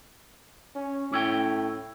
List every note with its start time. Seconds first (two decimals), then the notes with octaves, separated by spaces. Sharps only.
0.75 C#4
1.12 A2 C#4 E4 G5